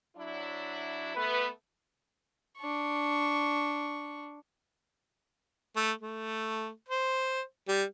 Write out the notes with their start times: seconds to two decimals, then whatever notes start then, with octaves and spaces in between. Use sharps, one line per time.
0.16 F#3 D4 E4
1.16 A3 B3 B4
2.58 D4 C#6
5.76 A3
6.01 A3
6.89 C5
7.68 G3